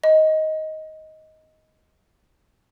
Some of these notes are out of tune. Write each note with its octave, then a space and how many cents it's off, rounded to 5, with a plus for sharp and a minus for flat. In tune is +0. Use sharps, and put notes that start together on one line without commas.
D#5 +10